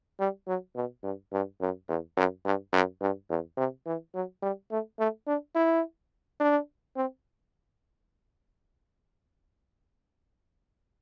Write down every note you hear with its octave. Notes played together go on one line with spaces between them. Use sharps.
G3
F#3
B2
G2
G2
F#2
E2
F#2
G2
F#2
G2
E2
C3
E3
F#3
G3
A3
A3
D4
E4
D4
C4